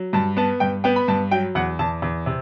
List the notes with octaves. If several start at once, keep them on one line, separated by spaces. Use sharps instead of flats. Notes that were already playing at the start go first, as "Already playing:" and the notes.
Already playing: F#3
G2 A5
B3 A5
G2 G5
B3 G5
B5
G2 A5
F#3 G5
E2 F#5
E2 A5
E2
C3